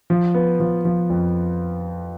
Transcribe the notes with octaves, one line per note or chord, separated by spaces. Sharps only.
F3
B3
F3
F3
F2